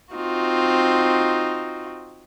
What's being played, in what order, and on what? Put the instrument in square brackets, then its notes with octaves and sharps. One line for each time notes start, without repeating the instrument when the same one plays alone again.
[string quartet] C4 D#4 F4 F#4